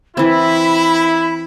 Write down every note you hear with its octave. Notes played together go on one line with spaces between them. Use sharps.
E3 C4 E4 B5